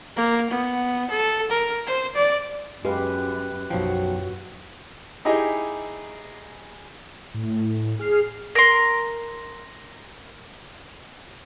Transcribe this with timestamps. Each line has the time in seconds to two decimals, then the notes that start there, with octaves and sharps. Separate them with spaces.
0.16 A#3
0.50 B3
1.10 A4
1.50 A#4
1.87 C5
2.15 D5
2.85 F#2 G#3 G4 B4 F5
3.70 B1 F#2 F3 F#4 C#5 G5
5.25 D#4 E4 G4 G#4 D#5
7.34 A2
7.99 G#4 F6 C7
8.55 A#4 C6